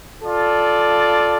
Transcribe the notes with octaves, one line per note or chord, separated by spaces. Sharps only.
F4 A4 D5